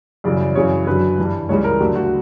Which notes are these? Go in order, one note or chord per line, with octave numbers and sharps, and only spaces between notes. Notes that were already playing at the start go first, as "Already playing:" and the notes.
F#2 C#3 E3 G3 D5
D5
F#2 C#3 E3 C#5
F#2 D3 F#3 B4
G2 E3 G3
C#2 C#3 E3 G3 C#5
A#4
D2 D3 F#3 G4
F#4